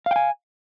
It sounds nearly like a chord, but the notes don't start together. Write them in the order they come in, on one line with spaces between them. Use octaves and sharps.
F5 G5 G#5